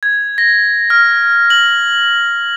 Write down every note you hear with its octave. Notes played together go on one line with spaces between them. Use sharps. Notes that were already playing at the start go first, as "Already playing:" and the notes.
G#6
A#6
F6
F#7